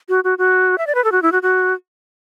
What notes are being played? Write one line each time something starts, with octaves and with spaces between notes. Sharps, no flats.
F#4
F#4
F#4
E5
D5
B4
A4
F#4
E4
F#4
F#4